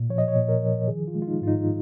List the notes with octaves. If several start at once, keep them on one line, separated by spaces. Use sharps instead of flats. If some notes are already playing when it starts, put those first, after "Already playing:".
Already playing: A#2
F3 C#5
D#5
C#5
A#2
A#4
F3
D#3 G#4
F4
G#3
F4
D#4
G#2 F4
D#4